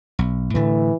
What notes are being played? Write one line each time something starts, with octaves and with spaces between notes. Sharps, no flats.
B1
A2 D3 E3 A3